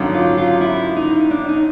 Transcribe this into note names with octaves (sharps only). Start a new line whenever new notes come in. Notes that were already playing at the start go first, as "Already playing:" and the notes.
Already playing: G#1 F#2 D3 F#3
F4
F4
E4
D#4
D4
D#4